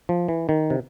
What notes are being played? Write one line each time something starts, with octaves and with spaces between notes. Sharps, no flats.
F3
E3
D#3
C3